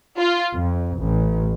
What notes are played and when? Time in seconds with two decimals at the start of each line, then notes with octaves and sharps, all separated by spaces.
0.18 F4
0.54 F2
0.99 A1